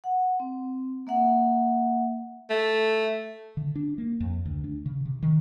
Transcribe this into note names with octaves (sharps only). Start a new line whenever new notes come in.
F#5
C4
A#3 E5 F#5
A3
D3
D4
A#3
F2
D2
D4
C#3
C3
D#3